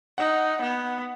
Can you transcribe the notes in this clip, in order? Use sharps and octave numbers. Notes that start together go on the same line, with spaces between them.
D#4 F#5
B3